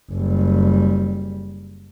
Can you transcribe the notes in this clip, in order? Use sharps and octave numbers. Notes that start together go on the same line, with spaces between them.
F#1 G3